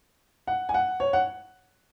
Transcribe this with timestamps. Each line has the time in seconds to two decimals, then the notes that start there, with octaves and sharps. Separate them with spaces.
0.47 F#5
0.69 G#5
0.74 F#5
1.00 C#5
1.13 F#5